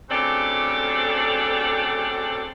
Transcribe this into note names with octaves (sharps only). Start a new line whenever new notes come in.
D2 C#3 C4 D4 G4 A4